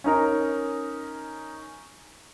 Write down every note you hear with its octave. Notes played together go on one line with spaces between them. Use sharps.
C#4 D#4 A#4